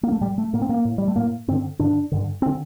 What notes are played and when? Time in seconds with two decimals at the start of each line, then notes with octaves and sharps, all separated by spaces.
0.03 A#3
0.12 A3
0.21 A2 G3
0.38 A3
0.53 A2 A#3
0.62 C4
0.69 A#3
0.85 A2
0.98 G3
1.08 A3
1.16 A2 A#3
1.48 G2 D3 C4
1.79 G2 D3 D4
2.12 G2 D3
2.42 C4
2.46 D3